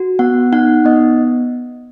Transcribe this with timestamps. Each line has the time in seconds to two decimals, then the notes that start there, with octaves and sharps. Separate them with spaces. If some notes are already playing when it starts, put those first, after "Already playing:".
Already playing: F#4
0.19 B3 F#5
0.52 D#4 F#5
0.85 B3 D#5